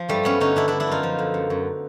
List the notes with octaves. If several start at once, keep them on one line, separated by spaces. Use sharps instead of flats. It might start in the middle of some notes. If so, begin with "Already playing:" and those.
Already playing: F3
G2 G3 A3
G2 B3 C#4
D3 C#4 D#4
D3 D4 E4
D3 D4 E4
D4 E4
F#2 D#4 F4
F3
D3
F#2
F#2